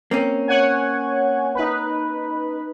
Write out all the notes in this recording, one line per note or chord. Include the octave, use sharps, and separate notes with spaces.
A#3 C4 C#4
C#5 F#5 G#5
D#4 B4